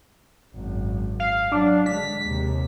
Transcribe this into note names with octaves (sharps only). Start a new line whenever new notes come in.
G#1 F#2
F5
F#3 D4
D3 G#3 B6
D#2 C3